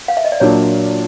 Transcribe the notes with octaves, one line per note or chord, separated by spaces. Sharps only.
F5
E5
D#5
D5
A#2 F#3 A#3 D4 C#5